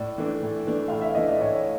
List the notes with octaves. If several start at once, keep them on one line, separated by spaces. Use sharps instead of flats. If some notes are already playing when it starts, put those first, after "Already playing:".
Already playing: A2 D5
E3 A3 D4
A2
E3 A3 D4
A2 F5
E5
E3 A3 D4 D#5
D5
A2 C#5